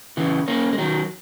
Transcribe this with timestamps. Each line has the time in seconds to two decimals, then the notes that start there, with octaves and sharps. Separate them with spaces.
0.17 C#3 E3
0.48 A#3 C#4
0.73 G#3
0.78 D#3 F#3